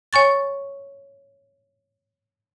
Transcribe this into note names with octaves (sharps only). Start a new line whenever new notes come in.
C#5 G#5 C#6 A6